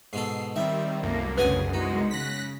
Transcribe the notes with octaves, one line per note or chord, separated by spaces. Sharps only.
G#2 B2 A4 C7
D#3 G3 C4 E5
C2 F#2 A3 A#3
D2 C#3 G#4 B4 F#5 G#5
G#3 B3 D#4 F#4
C#3 F#6 A#6 B6